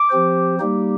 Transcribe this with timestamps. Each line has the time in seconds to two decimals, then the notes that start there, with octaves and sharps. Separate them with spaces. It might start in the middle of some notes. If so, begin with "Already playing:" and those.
Already playing: D6
0.10 F3 C4 G4 C5
0.59 G3 A#3 D#4 G4